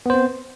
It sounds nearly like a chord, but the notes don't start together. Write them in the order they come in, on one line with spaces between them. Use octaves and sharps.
B3 C5 C4